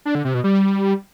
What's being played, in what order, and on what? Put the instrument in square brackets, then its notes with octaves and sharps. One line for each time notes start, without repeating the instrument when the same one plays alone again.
[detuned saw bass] D4
D3
C3
B2
G3